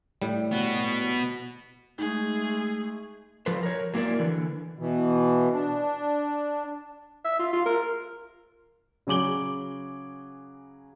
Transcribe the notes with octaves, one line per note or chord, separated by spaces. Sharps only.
A2 G3
B3 F#4
G#3 A3 D#4 G#4
F3 A4 B4 C5
A#4 C#5
F#3 A#3 E4 A#4 D5
D3 E3
B2 E3
D4
E5
F4
F4
A#4
C#3 F#3 G#4 D6 F#7 G7